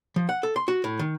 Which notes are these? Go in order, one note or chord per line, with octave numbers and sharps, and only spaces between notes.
F3
F#5
A4
C6
F#4
A2
D#3